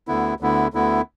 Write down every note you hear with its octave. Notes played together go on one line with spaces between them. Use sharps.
D2 D3 B3 E4
D2 D3 B3 E4
D2 D3 B3 E4